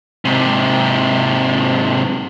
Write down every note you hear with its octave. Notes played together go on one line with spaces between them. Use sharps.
G#2 C3